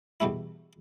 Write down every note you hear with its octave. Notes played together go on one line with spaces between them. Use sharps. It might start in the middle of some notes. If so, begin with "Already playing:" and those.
E2 B2 G3 A3 E4